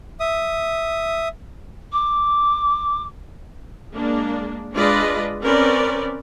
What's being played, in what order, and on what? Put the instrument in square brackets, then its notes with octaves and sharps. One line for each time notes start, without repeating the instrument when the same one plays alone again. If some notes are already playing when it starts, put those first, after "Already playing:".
[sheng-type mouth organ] E5 D#6
[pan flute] D6
[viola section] G#3 A#3 D4
G#3 D4 F4 B4 D5 D#5
C4 C#4 A#4 B4 D5